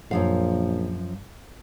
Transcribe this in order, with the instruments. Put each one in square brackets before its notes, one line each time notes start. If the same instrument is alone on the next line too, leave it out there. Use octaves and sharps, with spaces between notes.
[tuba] A#1 [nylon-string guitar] F#2 F3 F5